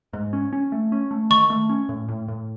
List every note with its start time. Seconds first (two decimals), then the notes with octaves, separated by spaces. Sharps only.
0.13 G#2
0.33 C#4
0.53 C#4
0.72 A3
0.92 C#4
1.11 A3
1.30 D#3 C#6
1.50 A3
1.69 C#4
1.89 A2
2.08 A2
2.28 A2